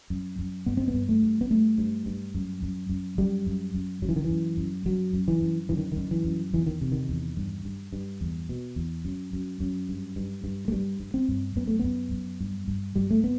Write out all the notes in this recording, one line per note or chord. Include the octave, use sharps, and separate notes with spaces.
F#2
F#2
G2 B3
C4
B3
G2
A3
G2
B3
G2 A3
G2
G2
F#2
F#2
F#2
F#2 G3
F#2
F#2
F#2 F#3
E3
D#3
E3
F#2
F#2
F#2 F#3
F#2
E3
F#2
F#2 E3
D#3
F#2 D#3
E3
F#2
E2 E3
D#3
C3
D#3
E2
G2
G2
G2
E2
B2
E2
F#2
F#2
F#2
G2
G2
G2
A3
G2 G3
G2
C4
G2
F#2 B3
A3
F#2 B3
F#2
G2
G2
G2 G3
A3
B3